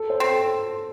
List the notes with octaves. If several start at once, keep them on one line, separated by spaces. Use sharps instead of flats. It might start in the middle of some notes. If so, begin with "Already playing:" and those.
Already playing: A4
C5
C4
A4